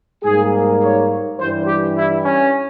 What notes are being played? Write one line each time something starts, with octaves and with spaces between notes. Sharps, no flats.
G#2 G3 A#3 G#4
C#5
G2 E3 G3 C5
G4
E4
C#4